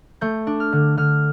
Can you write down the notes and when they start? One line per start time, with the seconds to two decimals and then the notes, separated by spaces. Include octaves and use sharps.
0.21 A3 G6
0.47 D4
0.60 F6
0.72 D3
0.97 D3 F6